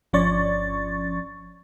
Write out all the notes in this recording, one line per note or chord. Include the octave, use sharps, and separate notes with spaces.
G1 F3 C#4 D5 C#6 A6